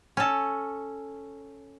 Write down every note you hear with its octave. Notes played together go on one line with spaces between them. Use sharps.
C#4 A4